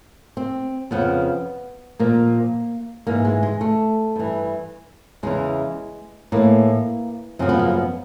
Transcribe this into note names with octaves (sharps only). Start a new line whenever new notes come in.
C4
F2 C#3 F3 B3
A#2 F3 A#3
G#2 E3 A#3
G#3
G#3
A3
G2 E3
E2 C#3 E3 G#3
A2 E3 A#3
F#2 C#3 F3 C4
B3
A#3
B3